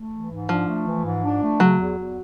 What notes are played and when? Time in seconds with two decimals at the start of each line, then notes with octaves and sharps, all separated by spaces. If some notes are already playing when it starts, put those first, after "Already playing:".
Already playing: A3
0.12 E3
0.30 G#2
0.49 F3 D4
0.67 A3
0.87 E3
1.05 G#2
1.23 D4
1.42 A3
1.60 C#3 F#3
1.79 E2
1.98 E2